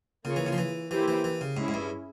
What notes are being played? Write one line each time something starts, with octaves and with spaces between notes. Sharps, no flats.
C#3 A#3 F4 G#4 C#5
E3
C#3
F3
E3
E3 A#3 E4 G4 C5
E3
E3
C#3
G#2 C#4 E4 G#4
G#2
G2